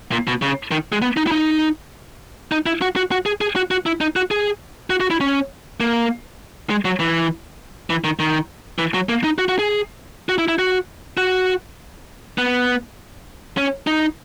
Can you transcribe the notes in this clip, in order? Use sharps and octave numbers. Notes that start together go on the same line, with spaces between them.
A#2
B2
C#3
D#3
G#3
B3
D#4
E4
D#4
D#4
E4
F#4
F#4
F#4
G#4
G#4
F#4
F#4
E4
D#4
F#4
G#4
F#4
F#4
E4
C#4
A#3
G#3
F#3
E3
E3
D#3
D#3
E3
F#3
A#3
D#4
F#4
F#4
G#4
F#4
E4
E4
F#4
F#4
B3
C#4
D#4